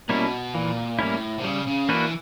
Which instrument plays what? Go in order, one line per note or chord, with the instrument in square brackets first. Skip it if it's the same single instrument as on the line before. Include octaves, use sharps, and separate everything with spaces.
[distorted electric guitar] B2 [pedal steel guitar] G3 A#3 C#4 E4
[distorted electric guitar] A#2 [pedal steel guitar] E3
[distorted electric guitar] A2 [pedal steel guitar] G3 A#3 C#4 E4
[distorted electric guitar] C3
[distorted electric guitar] C#3 [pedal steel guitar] G3
[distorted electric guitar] C#3
[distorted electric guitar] E3 [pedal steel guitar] A#3 D4 F#4 B4